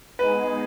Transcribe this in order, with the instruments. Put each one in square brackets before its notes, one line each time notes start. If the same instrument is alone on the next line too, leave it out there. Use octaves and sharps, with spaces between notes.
[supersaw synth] G#3 B3 D#4 G#4 [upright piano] B4